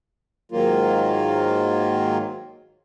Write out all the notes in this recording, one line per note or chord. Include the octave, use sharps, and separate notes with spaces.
G#2 D#3 F#3 A#3 F4